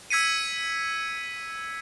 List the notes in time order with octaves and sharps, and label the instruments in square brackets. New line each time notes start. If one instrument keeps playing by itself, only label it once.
[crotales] E6 G#6 B6 C#7 D#7